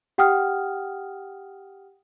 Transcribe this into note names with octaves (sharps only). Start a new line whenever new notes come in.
G4 F#5 G5 D#6 F6